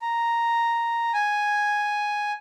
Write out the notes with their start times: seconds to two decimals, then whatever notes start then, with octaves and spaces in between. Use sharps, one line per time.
0.02 A#5
1.14 G#5